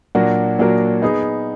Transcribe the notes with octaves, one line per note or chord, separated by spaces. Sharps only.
A#2 F#3 D4 F#4 A#4
A#2 F#3 D4 F#4 A#4
B3 D#4 G#4